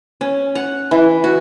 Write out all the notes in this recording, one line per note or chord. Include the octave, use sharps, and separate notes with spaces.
C#4
F#5
E3
F#4